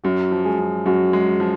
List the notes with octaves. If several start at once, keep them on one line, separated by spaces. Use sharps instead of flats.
F#2 F#3 F#4
F3
G#3 G#4
F#2
F#2 F#3 F#4
G#3
F3